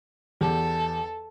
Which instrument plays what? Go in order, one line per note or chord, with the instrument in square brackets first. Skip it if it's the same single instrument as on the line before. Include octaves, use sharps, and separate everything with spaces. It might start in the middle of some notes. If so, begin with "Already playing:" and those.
[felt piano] E2 G4 [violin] A4